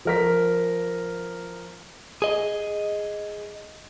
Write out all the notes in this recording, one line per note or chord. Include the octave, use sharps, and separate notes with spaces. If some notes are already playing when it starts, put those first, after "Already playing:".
F3 A#4 B6
G#4 D#5